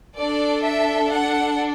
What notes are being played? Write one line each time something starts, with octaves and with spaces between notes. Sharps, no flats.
D4 A4 D5
E5
F#5